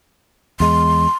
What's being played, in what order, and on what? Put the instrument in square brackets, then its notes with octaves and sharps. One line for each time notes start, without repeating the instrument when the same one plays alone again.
[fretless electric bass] E2 G#3 [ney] C6